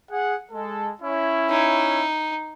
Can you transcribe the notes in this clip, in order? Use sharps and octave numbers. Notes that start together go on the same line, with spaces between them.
G#4 F#5
G#3 A4
C#4 E4
D#4